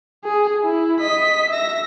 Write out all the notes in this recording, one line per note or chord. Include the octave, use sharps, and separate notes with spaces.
G#4
E4
D#5 B6
E5 A#6